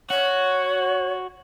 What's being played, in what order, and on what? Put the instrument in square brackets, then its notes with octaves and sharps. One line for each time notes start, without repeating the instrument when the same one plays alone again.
[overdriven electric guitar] F#4 [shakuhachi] C#5